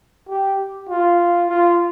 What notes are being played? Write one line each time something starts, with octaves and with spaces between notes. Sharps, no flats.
G4
F4
F4